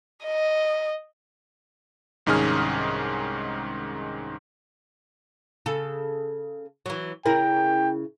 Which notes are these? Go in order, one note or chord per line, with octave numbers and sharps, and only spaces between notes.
D#5
C2 G#2 D#3 C#4 G#4 F6
C#3 A4
E3 F#3
C#3 E4 A#4 G5